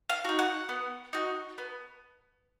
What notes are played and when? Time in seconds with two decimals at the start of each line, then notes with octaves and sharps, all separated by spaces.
0.09 F5
0.25 D#4 F#4
0.39 F#5
0.69 B3
1.13 D#4 F#4
1.58 B3